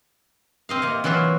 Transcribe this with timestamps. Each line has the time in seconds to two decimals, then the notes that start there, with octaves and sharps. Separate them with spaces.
0.69 C4 D#5 F5
0.82 C3 A#3
1.04 E3 F#3 F4 F#4 E5